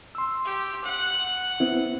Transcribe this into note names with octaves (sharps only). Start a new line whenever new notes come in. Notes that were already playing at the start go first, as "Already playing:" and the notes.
C6 E6
G4
F#5
B3 C4 E4